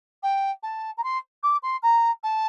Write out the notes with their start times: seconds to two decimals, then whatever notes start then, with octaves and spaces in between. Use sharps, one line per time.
0.23 G5
0.63 A5
0.98 A#5
1.04 C6
1.43 D6
1.63 C6
1.83 A#5
2.24 A5